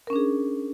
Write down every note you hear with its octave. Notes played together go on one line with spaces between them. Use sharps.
C#4 D4 G#4 A#4